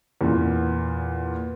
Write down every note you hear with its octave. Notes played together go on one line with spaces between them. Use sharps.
E2 A#2